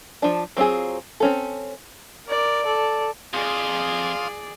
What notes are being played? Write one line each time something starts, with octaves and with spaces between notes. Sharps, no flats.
F3 D4
F#3 C4 F4 G#4
C4 C#4 A4
A#4 D5
A4 D5
F2 G#4 D5 F5 C6 D#6